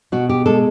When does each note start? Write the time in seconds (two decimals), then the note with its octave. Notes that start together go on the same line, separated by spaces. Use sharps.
0.12 B2 F#4
0.29 G4
0.46 G#3 A4